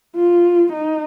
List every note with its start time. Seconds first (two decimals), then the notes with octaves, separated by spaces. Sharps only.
0.16 F4
0.73 D#4